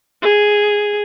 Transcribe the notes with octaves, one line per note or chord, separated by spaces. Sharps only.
G#4